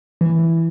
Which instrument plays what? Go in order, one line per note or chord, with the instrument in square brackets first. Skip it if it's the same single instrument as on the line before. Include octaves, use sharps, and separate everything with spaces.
[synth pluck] E3